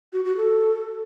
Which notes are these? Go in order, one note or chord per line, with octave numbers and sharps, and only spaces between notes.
F#4
F#4
A4